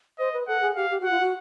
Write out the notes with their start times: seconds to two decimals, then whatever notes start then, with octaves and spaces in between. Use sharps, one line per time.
0.18 C5 D#5
0.33 B4
0.48 A4 F#5
0.62 G#4
0.76 G4 F5
0.91 G4
1.00 F#4 F#5
1.11 F4
1.20 F#4